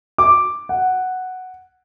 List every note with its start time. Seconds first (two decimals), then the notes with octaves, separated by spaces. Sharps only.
0.18 D6
0.69 F#5